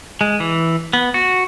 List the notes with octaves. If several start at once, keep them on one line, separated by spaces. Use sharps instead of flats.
G#3
E3
B3
F#4